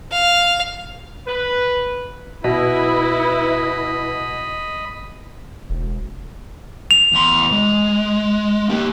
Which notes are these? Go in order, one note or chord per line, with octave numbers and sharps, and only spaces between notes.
F5
B4
B2 E4 B4 D#5 B5
E1
F7
E2 C6
G#3
A#3 G4